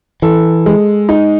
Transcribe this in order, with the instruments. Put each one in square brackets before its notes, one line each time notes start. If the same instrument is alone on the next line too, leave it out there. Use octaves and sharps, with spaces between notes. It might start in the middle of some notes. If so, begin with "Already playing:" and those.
[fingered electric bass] E3 [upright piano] A4
[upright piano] G#3
D#4